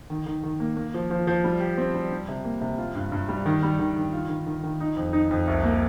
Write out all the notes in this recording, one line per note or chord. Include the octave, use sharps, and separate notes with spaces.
D#3
D#3
D#3
A#3
A#3
F3
F3
F3
G3
G4
C4
G3
G3
C3
A#3
C3
F4
G2
G2
G3
D#3
G3
D#3
D#3
F4
D#3
D#3
D#3
D#4
F2
D#4
F2
C2
A#3